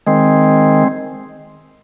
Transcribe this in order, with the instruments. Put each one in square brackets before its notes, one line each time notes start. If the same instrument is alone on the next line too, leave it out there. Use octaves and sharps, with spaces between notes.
[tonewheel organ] D#3 G#3 C4